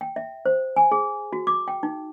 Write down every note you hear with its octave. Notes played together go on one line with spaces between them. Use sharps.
G5
E5
C5
G#5
G#4
F#4
D6
G5
D#4